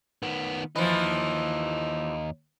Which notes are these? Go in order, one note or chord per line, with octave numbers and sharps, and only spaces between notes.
D#3 B3
D#2 E3 F3 D#4